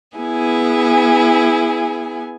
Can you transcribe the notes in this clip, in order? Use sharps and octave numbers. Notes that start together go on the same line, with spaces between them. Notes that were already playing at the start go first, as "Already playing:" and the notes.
B3 E4 G#4 G#5